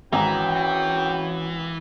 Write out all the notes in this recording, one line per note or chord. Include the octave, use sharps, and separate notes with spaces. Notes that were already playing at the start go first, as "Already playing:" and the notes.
G#1 E3 C#4 F#4 G5 A#5